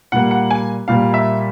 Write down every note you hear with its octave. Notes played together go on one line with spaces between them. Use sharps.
A#2 G3 A#3 F#5
F#5
G#5
A#2 G3 A#3 F5
E5